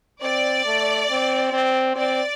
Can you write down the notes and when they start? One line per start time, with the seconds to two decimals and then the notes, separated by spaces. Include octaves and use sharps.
0.22 C4 D5
0.66 A3
1.10 C4
1.53 C4
1.95 C4 D5